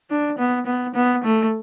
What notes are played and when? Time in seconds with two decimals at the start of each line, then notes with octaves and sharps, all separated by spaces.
0.10 D4
0.38 B3
0.66 B3
0.95 B3
1.24 A3